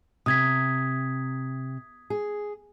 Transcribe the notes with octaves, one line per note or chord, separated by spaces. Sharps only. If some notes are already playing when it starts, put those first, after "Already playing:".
C3 D#6 G#6 B6
G#4